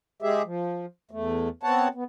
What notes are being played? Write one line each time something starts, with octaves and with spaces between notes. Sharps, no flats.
G#3 G4 G#4 E5
F3
E2 A3
B3 C4 C#5 F#5 A5
B3